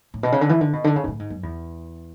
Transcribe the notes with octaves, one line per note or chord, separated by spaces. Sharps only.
A2
B2
C#3
D3
E3
D3
B2
D3
C#3
G#2
A2
G#2
F#2
E2